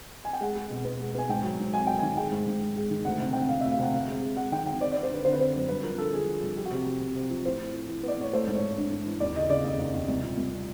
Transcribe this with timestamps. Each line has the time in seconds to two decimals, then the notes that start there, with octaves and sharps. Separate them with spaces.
0.25 G#5
0.33 G5
0.41 G#3 F#5
0.56 G#3
0.70 B2
0.85 B3
1.00 G#3
1.15 B3 G#5
1.29 G#2 G5
1.44 F#3
1.59 G#2
1.74 F#3 G#5
1.87 F#3 G5
1.99 D#3 G#5
2.17 G#3 G5
2.31 G#2
2.46 G#2
2.61 G#2
2.76 G#3
2.90 D#3
3.05 D2 F#5
3.19 C3
3.33 C3 G5
3.40 F#5
3.49 C3 F5
3.61 D2 E5
3.72 F5
3.79 C3 F#5
3.93 C3 F5
4.08 G#3
4.22 G#3
4.37 G#3 F#5
4.51 D#3 G5
4.66 D#3 G5
4.80 C4 D5
4.92 C4 D5
5.03 C5
5.10 D3 B4
5.25 D3 C5
5.33 B4
5.40 C4 C5
5.54 F#2
5.69 G2 B4
5.83 F3 A#4
5.98 D3 A4
6.13 F3 G#4
6.28 F3
6.42 G2
6.57 F3 G4
6.65 F#4
6.71 C3 G4
6.86 C3
7.01 C3
7.16 C3
7.30 F3
7.45 A2 C5
7.60 A2
7.74 A2
7.89 E3
8.03 B3 D5
8.19 A2 C#5
8.33 A3 C5
8.47 G#2
8.55 C#5
8.62 E3
8.77 D4
8.92 G#2
9.06 E3
9.20 D#2 D5
9.36 C#3 D#5
9.50 C#3 D5
9.65 D#2 D#5
9.79 D#2
9.94 D#2
10.08 C2
10.23 A#2
10.38 C2